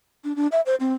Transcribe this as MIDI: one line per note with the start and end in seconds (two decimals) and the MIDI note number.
0.24 0.36 62
0.36 0.47 62
0.52 0.61 76
0.66 0.75 72
0.80 0.93 60